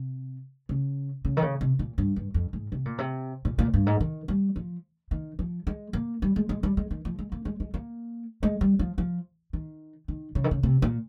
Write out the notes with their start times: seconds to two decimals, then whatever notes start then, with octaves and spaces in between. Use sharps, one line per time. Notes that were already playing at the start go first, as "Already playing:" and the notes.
Already playing: C3
0.69 C#3
1.25 C#3
1.37 D#3
1.42 C#3
1.61 C3
1.79 A#2
1.98 G2
2.16 G2
2.34 F2
2.53 G#2
2.72 C3
2.85 A#2
2.98 C3
3.45 A#2
3.59 A#2
3.74 G2
3.86 G#2
4.01 D#3
4.28 G3
4.56 F3
5.11 D#3
5.39 F3
5.67 G#3
5.93 A#3
6.22 G3
6.36 G#3
6.49 G#3
6.63 G3
6.77 G#3
6.91 D#3
7.05 F3
7.19 G#3
7.32 A#3
7.45 G#3
7.60 G#3
7.74 A#3
8.43 G#3
8.61 G3
8.79 F3
8.98 F3
9.53 D#3
10.08 D#3
10.35 C#3
10.44 D#3
10.51 C#3
10.63 C3
10.82 A#2